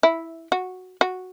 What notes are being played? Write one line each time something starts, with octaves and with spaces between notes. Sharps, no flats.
E4
F#4
F#4